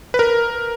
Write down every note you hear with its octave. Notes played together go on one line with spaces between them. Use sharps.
B4
A#4